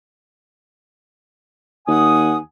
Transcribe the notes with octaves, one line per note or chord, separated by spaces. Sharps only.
D#2 F#5 G#5 D#6